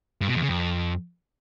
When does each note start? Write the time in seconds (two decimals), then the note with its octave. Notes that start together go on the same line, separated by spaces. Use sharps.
0.21 G2
0.28 B2
0.35 E2
0.42 C#3
0.49 F2